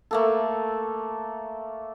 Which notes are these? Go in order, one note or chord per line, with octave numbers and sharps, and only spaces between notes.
A3 A#3 A4